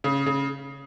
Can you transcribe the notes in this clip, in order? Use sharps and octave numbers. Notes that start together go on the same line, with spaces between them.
C#3
C#3